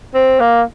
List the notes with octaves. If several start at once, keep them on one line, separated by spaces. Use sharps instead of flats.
C4
A#3